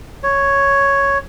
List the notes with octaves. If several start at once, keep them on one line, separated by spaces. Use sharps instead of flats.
C#5